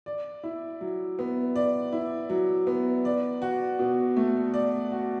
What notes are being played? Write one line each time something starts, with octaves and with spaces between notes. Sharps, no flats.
D5
E4
F#3
B3
D5
E4
F#3
B3
D5
F#4
B2
A3
D5
F#4